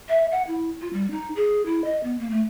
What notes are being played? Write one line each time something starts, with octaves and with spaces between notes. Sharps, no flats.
E5
F#5
E4
F4
G3
D#4
G#4
E4
D#5
B3
A#3
A3